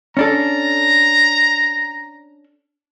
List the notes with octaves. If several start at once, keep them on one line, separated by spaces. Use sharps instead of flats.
C#4 D4 A4 A#5